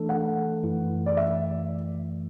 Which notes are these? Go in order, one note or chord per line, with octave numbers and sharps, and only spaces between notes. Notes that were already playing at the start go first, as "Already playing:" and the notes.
Already playing: E3 A3 D4 A4
F#5
F#2 E3 A3 E4
D5
E5